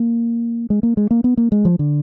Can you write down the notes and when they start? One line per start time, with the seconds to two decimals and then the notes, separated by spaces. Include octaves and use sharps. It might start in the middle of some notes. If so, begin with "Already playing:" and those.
Already playing: A#3
0.70 G#3
0.83 A#3
0.97 G#3
1.11 A#3
1.24 B3
1.37 A#3
1.52 G#3
1.65 F3
1.79 D3